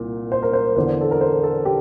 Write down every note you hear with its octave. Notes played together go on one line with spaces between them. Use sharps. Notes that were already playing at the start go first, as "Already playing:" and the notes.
Already playing: C2 A#2
C5
A#4
C5
E2 D3 C5
A4
A#4
C5
A4
G4